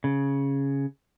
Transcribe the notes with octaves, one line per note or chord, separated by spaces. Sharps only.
C#3